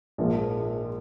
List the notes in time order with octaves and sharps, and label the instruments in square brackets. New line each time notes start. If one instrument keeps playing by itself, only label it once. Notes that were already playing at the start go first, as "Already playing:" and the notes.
[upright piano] A#1 G#2 F3 A#3